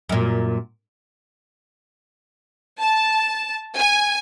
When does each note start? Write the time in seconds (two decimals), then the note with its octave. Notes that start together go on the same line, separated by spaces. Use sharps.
0.09 F#2 A#2
2.81 A5
3.78 G#5